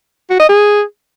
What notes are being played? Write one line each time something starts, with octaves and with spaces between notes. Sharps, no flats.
F#4
D#5
G#4